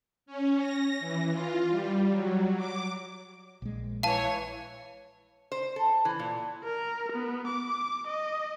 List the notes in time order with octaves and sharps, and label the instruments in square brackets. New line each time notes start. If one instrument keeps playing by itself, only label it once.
[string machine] C#4
A#6
E3
F4
G3
F#3
D6
[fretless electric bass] A#1 G#3
[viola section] E3 C#5 [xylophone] F5 A5
[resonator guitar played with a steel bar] C5
A4
E3
A#2
[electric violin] A#4
B3
D6
D#5